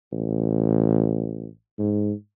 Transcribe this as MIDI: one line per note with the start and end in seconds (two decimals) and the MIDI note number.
0.12 1.48 33
1.79 2.13 44